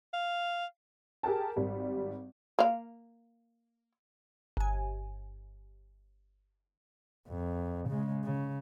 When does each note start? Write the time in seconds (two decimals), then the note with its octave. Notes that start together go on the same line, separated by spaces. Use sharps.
0.14 F5
1.23 G4 G#4 A#4 G5 A5
1.56 G#1 G3
2.59 A#3 F5
4.57 G1 G#5
7.28 F2
7.89 C#3 G#3
8.24 C#3